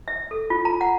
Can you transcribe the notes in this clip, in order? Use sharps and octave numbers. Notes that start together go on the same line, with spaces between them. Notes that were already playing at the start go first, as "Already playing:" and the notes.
E5
A4
F4
A#5
F#5